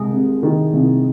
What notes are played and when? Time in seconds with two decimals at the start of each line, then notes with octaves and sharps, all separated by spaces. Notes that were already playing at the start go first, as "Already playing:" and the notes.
Already playing: C2 G#3 G#4
0.13 C3
0.43 D#3
0.73 C2